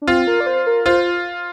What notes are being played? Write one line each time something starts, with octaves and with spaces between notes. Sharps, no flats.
D4
C4 F4
A#4
D5
C5
A#4
F4 C5